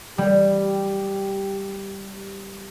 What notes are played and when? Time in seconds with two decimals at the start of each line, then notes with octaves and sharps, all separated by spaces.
0.18 G3 G4